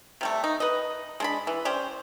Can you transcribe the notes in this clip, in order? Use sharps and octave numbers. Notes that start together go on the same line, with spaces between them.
C3 G3 A3
D#4
B4 D#5
G#3 D4 B5
E3
C#4 G4 C5 D5